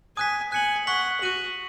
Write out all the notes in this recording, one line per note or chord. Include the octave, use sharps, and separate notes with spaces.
G#5 D#6 F#6 B6
G#5 F#6 C#7 F#7
F#5 C#6 B6 F#7
F#4 F#6 D#7 F#7